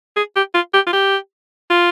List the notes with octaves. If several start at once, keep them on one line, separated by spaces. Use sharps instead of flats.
G#4
G4
F4
G4
F4
G4
F4